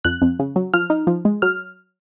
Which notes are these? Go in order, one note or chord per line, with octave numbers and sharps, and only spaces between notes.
F2 F#6
F2
C#3
F#3
F3 F6
D#4
F3
G#3
F#3 F6